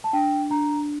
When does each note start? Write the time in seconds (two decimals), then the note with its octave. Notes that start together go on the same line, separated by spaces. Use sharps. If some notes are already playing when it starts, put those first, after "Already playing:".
0.04 A5
0.13 D4 G5
0.50 D4 A#5